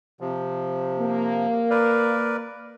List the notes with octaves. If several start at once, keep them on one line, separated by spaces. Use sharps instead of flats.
C3 F3
A#3
A#4 B4 D5